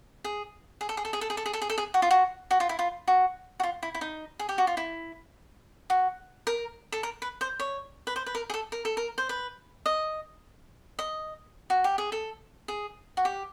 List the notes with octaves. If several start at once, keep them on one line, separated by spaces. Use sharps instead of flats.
G#4
G#4
A4
G#4
A4
G#4
A4
G#4
A4
G#4
A4
G#4
A4
G#4
F#4
F4
F#4
F#4
F4
E4
F4
F#4
F#4
F4
E4
E4
D#4
G#4
G4
F#4
F4
E4
F#4
A#4
A4
A#4
B4
C5
C#5
B4
C5
B4
A#4
G#4
A4
A#4
A4
A#4
C5
B4
D#5
D#5
F#4
G4
G#4
A4
G#4
F#4
G4